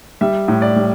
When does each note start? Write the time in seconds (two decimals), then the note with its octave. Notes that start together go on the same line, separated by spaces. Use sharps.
0.21 G3 E5
0.48 A2
0.62 D5
0.76 G3